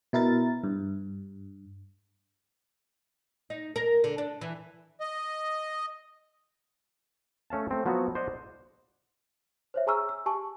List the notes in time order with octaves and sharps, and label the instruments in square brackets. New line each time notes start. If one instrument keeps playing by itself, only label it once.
[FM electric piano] B2 E4 A#4 A6
G2
[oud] D#4
A#4
D3
D4
E3
[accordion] D#5
[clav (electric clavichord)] A3 C#4 F5 A5
A3 C4
F3 F#3 B3 F#4
C5 D5 D#5 F#5
[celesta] C5 C#5 E5
G#4 G#5 A#5 C#6 E6 F6
E6
G4 G#5 A5 C#6